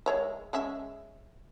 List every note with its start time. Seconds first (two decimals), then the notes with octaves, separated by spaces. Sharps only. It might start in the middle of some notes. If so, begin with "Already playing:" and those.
0.06 G#3 C#5 E5
0.53 G#3 C#4 E5